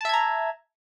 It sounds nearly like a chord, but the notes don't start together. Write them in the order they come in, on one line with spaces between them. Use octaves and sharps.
A5 E5 G#6 A#5